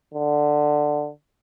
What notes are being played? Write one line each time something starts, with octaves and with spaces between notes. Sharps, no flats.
D3